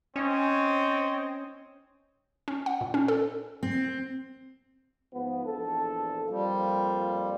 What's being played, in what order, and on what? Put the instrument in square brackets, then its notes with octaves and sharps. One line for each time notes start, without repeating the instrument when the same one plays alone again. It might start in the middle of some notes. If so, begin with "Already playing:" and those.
[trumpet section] C4 C#5 D#5 [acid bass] C#4
[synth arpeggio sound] C#4
F#5
A#2
C#4
A4
[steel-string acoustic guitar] C4
[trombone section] G#2 F3 B3
A#1 E2 A4
[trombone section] F2 A#3 F4 [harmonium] G3